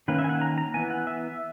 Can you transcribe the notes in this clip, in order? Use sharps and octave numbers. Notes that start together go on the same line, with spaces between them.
D#3 A#3 C#4 B4
E5
G#5
F#5
A#5
A#5
E3 B3 G#5
F#5
E5